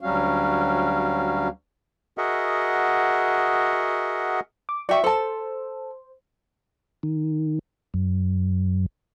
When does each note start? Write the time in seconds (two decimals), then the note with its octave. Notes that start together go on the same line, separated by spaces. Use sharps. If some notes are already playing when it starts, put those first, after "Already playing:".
0.01 D2 F#3 G3 C#4 F#4 F5
2.18 F#4 G#4 A#4 D#5 E5 F#5
4.69 D6
4.89 F#4 D5 E5 G5 C#6
5.04 A4 C5 A5
7.03 D#3
7.94 F#2